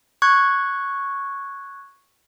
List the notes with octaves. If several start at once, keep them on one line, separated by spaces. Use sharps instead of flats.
C#6 F#6 G#6